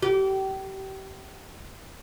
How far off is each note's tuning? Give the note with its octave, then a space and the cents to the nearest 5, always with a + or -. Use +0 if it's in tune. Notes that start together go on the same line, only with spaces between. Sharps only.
G4 -30